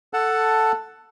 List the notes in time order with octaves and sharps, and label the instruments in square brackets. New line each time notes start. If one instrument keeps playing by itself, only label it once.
[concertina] A4 F#5 A5